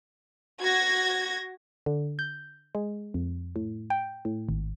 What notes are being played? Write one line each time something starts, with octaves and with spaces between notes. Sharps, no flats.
F#4 G#6 A#6
D3
G6
G#3
F2
A2
G5
A2
G#1